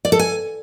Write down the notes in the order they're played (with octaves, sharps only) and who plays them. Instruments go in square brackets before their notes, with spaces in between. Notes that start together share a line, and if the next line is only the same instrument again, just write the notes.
[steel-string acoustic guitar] D5
A4
G#5